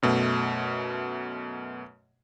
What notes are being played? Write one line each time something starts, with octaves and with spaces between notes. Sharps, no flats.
F#2 B2 A3